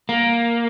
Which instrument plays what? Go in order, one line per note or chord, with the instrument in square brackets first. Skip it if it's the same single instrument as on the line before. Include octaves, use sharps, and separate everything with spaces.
[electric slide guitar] A#3